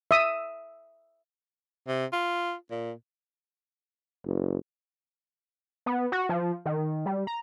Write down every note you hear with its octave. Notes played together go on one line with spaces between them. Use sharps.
E5 D#6
C3
F4
A#2
F#1
B3
F#4
F3
D#3
G3
A#5